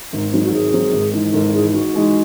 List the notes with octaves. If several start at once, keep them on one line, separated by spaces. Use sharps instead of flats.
G#1 D#4
G#2 F#3 C4 D#4
F#4
G#1 G#4
G#2 F#3 C4
G#1
G#2 E3
G#1 A4
G#2 E3 G#4
G#2 F#4
E3 G#3 D#4